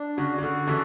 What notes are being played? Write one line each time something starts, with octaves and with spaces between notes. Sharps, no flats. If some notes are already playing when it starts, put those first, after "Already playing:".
Already playing: D4
C#3 F#4
C#3
D3 F#4
C#3 E3 A4